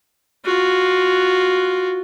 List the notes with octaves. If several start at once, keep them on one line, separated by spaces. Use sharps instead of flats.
F4 F#4